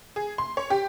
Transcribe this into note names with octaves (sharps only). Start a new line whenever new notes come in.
G#4
C6
C#5
G4